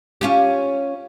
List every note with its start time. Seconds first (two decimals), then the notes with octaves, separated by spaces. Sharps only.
0.21 C#4 F4 G4